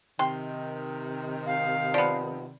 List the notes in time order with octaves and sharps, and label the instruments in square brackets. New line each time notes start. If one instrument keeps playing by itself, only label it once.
[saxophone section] C3 D#3 [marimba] G5 [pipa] C6
[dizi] F5
[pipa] F3 B3 [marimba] D5